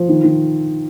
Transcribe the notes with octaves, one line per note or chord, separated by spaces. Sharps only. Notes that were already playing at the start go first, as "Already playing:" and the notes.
Already playing: F3
D#3
D#3